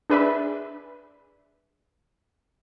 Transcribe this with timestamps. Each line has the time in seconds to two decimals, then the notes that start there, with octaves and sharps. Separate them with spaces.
0.10 D4 G#4 B4 D5 E5 B5